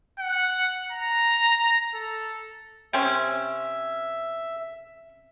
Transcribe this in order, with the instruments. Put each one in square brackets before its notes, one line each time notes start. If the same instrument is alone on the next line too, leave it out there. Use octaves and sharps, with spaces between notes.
[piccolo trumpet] F#5
A#5
A4
[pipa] C3 C4 C#4 [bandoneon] E5